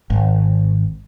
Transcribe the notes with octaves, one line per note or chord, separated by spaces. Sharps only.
G#1